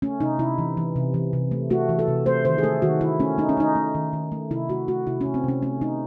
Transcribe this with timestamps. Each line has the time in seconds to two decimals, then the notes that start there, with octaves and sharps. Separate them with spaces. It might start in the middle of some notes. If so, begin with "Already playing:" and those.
0.02 A3 C#4
0.20 C3 D#4
0.39 C3 E4
0.58 E3
0.77 E3
0.96 C3
1.14 E3
1.33 C3
1.51 A3
1.70 A3 F#4
1.89 E3
1.99 A4
2.08 C3
2.26 A3 C5
2.45 D#3 C5
2.58 G#4
2.63 A3 A4
2.82 D#3 F#4
3.01 D#3 E4
3.20 A3 C#4
3.38 A3 D#4
3.49 C#4
3.57 A3 D#4
3.75 A3
3.95 D#3
4.13 D#3
4.32 A3
4.51 C3 E4
4.69 A3 F#4
4.88 A3 F#4
5.07 C3 E4
5.21 A3 C#4
5.34 C4
5.44 C3 C#4
5.62 A3 C#4
5.81 A3 D#4